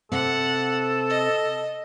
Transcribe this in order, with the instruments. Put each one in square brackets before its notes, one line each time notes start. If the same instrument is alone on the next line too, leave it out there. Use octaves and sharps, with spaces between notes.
[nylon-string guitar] C3 C4 [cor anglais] A4 [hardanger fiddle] F#5
[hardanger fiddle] D#5